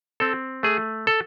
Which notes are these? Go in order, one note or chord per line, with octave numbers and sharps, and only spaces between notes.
C4 A4
A3 G#4
A4